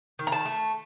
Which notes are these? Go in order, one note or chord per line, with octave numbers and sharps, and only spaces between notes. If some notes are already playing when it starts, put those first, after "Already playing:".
D#3
A#5
A5
A3